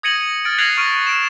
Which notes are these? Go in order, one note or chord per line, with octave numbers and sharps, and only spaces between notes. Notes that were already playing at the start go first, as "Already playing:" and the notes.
D#6 G#6 A#6 C#7 D#7 F#7
F6 A6 D7
F#6 G#6 A#6 C7 F7 F#7
C#6 F6 D7 D#7
D7 E7